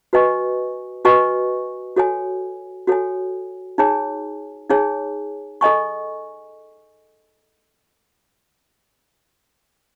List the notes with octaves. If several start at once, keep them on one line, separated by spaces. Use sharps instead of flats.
F#4 B4 D#5 G#5 C#6
F#4 B4 D#5 G#5 C#6
F#4 A4 C#5 G#5
F#4 A4 C#5 G#5
D#4 G#4 C#5 G#5
D#4 G#4 C#5 G#5
A4 D#5 G#5 C#6